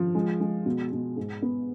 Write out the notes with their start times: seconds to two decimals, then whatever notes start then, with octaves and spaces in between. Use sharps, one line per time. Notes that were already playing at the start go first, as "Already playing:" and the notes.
Already playing: F3
0.15 G#3
0.40 G#3
0.66 B2
0.92 B2
1.17 G#2
1.42 B3